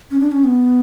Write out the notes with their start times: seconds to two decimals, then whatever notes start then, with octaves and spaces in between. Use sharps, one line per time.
0.11 C#4
0.20 D4
0.32 C#4
0.44 B3